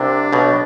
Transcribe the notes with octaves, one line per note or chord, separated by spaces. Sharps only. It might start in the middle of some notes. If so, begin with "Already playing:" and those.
Already playing: C2 C3 D4
B1 B2